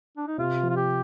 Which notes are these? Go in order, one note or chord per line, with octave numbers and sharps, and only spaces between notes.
D4
D#4
C3 F4
F3
F4
G4